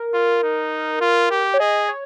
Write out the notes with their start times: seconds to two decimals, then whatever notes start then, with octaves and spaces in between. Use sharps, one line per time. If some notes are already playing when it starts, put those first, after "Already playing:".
Already playing: A#4
0.14 F4
0.43 D#4
1.01 F4
1.30 G4
1.54 C#5
1.60 G#4 D#5
1.89 C#5